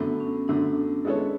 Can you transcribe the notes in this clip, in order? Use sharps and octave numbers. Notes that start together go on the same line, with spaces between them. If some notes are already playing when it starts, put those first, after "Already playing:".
Already playing: F#2 D3 A3 B3
C#4
F#2 D3 A3 D4
G#3 B3 E4 A4 C#5